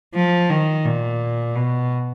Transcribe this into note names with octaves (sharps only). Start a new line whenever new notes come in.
F3
D#3
A#2
B2